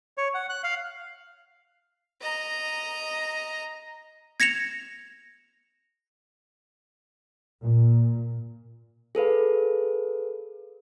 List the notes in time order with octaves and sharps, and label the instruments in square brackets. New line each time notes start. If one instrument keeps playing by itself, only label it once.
[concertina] C#5
F#5
F#6
F5
[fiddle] D#5 A#5
[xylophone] G#6 A#6 C#7 E7 F7
[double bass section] A#2
[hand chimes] G#4 A4 B4 F5